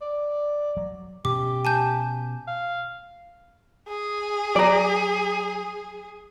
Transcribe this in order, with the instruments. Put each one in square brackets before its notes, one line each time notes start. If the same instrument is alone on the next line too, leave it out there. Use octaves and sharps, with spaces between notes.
[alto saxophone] D5
[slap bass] F#3
[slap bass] B2 C#4 [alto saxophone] G4 [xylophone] D6
[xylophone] G#5 A5 G6
[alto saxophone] F5
[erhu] G#4
[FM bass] F#3 [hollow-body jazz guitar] D5 A#5